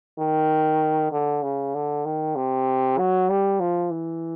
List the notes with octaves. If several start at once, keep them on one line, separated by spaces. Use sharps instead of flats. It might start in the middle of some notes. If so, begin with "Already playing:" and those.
D#3
D3
C#3
D3
D#3
C3
F#3
G3
F3
E3